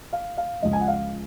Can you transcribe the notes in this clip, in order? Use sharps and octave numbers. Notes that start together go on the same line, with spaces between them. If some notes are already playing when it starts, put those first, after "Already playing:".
F5
F5
C#2 C#3 F3 G#3 D#5
G#5
F#5
F5